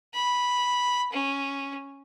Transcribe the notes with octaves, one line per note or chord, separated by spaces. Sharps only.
B5
C#4